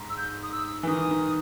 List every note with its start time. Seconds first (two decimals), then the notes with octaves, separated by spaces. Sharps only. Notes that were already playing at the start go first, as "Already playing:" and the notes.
Already playing: G#2
0.10 E6
0.17 G6
0.43 D#6
0.52 E6
0.83 E3
0.87 D#3 D#6
1.11 D#3